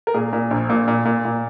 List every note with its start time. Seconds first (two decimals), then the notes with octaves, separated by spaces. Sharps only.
0.07 A#4
0.14 A#2 G#4
0.33 A#2
0.51 A#1
0.69 A#2
0.88 A#2
1.05 A#2
1.25 A#2